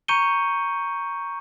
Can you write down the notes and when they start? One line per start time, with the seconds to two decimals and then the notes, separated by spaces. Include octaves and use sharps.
0.08 A#5 C#6 G6 C#7 D#7 G7